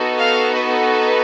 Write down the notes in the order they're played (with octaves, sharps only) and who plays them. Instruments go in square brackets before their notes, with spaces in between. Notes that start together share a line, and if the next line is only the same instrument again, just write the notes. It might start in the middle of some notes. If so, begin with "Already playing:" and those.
Already playing: [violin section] B3 D#4 F#4 A4
F5
B4